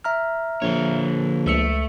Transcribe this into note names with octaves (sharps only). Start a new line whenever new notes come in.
E5 A#5 F6
A#1 D3 C#5
C#2 A3 E6 C#7